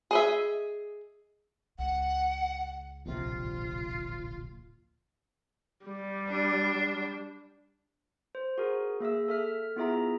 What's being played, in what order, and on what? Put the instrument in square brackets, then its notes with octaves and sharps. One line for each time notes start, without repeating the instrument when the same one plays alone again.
[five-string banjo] G#4 D#5 E5
[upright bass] C#2 [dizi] F#5
[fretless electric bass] D1 A#1 C3 [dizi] F4
[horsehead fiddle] G3
[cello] D4
[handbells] C5
F#4 G#4 A#4
A#3 G#4 E5 E6
A4 E5 F6
B3 E4 F4 G#4 E5 A#5